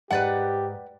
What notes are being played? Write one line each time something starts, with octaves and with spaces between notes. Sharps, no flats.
G#2 G4 B4 D5 F#5